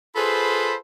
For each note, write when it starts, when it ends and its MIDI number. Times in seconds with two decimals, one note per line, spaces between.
0.16 0.74 65
0.16 0.74 68
0.16 0.74 69
0.16 0.74 71
0.16 0.74 72
0.16 0.74 83